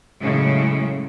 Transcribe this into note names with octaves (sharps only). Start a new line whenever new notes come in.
A2 C#3 F#3 G#3